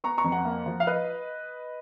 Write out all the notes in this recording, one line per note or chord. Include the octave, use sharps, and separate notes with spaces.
B3 A#5 C#6
A#5 C#6
F2
F#5 A#5
A#3
F3
F5
B4 D#5